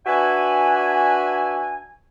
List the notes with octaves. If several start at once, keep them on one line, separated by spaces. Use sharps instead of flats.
D4 F#4 B4 E5 G#5